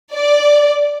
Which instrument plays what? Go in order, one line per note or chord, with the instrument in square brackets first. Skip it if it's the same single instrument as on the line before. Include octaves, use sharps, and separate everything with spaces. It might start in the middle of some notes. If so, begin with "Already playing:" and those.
[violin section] D5